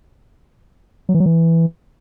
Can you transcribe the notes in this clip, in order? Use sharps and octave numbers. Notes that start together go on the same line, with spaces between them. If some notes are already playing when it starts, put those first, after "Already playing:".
F#3
E3
F#3
E3